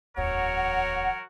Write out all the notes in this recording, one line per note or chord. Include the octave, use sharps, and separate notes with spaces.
D1 E2 F#3 F#4 A#4 C#5 F#5